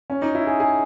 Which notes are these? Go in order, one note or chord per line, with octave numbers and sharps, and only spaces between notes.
C#4
D#4
E4
G#4
G#4